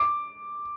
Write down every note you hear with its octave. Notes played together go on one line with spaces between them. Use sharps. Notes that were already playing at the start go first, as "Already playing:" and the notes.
Already playing: D6